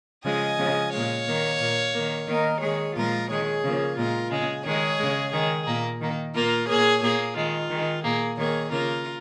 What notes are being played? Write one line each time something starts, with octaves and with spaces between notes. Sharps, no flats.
C#3 F3 G#3 D#5 G#5
C#3 F3 G#3
A#2 G#3 C#5 F5
D#3 A#3
A#2 A#3
D#3 A#3
D#3 A#3 A#4 D#5
D#3 G#3 G#4 C#5
A#2 F3 G#3 F4 A#4
D#3 G#3 G#4 C#5
C#3 F3 A#3
A#2 G#3 F4 A#4
C#3 G#3 G#4
D#3 G#3 G#4 C#5
C#3 G#3
D#3 G#3 G#4
A#2 A#3
D#3 A#3
A#2 A#3 F4 A#4
A#2 A#3 G#4 C#5
A#2 A#3 G#4
D#3 G#3 F4
D#3 G#3
A#2 A#3 G#4
D#3 A#3 G#4 C#5
C#3 A#3 F4 A#4